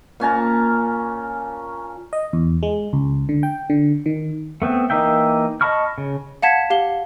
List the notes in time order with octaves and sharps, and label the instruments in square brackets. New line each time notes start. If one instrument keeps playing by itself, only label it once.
[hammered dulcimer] A#2 C#4 A5 A#5
[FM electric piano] D#5
E2
G#3
C#2
D3
G5
D3
D#3
[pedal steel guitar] A3 B3 C4
E3 A#3 D#4 E5 G5
D#5 A5 B5 C#6 F6
C#3
[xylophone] F5 F#5 A5 G#6 B6
G4 F5 G7